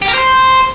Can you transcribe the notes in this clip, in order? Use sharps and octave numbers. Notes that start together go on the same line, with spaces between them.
G4
A#4
C5